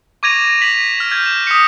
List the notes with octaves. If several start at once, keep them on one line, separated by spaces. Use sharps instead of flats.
C#6 D6 G#6 A#6 D#7 F7
B6 F7 F#7
F6
F6 G6 G#6
E7
D#6 B6 C#7